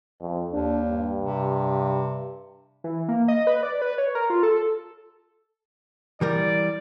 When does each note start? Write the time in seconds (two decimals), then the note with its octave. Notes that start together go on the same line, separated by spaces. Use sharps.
0.21 F2
0.52 D#2 D4
0.90 G2
1.21 C3
2.84 E3
3.08 A#3
3.28 D#5
3.47 B4
3.63 D5
3.82 B4
3.98 C#5
4.15 A#4
4.30 F4
4.43 A4
6.21 E3 G3 A#4 D5